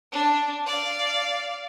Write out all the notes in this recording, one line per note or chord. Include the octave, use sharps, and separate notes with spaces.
D4
D5 F5